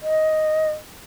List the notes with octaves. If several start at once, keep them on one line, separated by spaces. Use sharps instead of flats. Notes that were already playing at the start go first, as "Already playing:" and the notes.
D#5